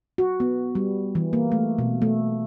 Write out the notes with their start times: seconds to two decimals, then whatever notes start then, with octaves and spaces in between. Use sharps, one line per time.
0.18 F#4
0.40 B3
0.75 G3
1.15 E3
1.33 A#3
1.52 A3
1.79 B2
2.02 A3